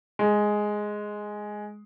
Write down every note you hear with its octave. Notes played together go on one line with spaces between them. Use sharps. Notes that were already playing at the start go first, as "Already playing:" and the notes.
G#3